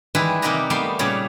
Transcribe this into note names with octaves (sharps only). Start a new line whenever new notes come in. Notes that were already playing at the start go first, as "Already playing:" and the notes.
D#3 E3 G3 G#3 E4 B4
C3 A#3 D#4 G4 B4 A#5
G3 A3 B3 F5 G5
A#2 C#3 G3 C#5